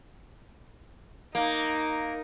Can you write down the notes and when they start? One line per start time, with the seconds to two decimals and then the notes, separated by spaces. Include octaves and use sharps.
1.35 A#3 D#4